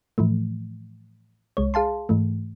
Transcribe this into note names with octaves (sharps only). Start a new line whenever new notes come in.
A2 E3 F3 A3
C2 G#3 C#5
G#4 F5 A5 C6
G#2 E3 A3